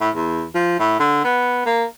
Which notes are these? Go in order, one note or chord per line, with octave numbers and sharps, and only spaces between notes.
A2
E2
F3
A2
D3
B3
A#3